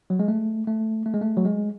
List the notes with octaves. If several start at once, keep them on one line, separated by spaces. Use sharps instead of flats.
F#3
G#3
A3
A3
A3
G#3
A3
F#3
G#3